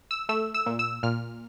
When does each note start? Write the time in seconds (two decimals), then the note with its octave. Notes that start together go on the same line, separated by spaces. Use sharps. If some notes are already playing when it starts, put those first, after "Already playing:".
0.11 E6
0.29 A3 E6
0.54 E6
0.66 A#2
0.79 E6
1.03 A#2 F6